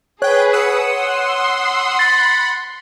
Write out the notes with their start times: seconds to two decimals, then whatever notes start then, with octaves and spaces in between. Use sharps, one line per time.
0.22 G#4 B4 C#5 G5 F#6
0.53 F#5 D#6 E6
0.92 C6
1.99 F#5 B5 A6